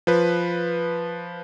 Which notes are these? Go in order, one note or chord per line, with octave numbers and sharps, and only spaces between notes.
F3 B4